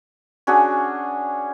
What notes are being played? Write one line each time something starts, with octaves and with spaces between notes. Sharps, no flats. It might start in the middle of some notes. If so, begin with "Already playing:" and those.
C#4 D4 F#4 G#4